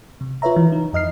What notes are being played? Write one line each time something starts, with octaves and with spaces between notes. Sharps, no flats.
C3
F4 B4 C#5 E5 A#5
E3
D#4
F2 D#5 F6 C7